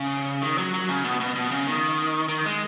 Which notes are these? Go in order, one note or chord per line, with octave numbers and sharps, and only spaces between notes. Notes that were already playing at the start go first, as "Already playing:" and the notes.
Already playing: C#3
D#3
F#3
F#3
C#3
B2
B2
B2
C#3
D#3
D#3
G#3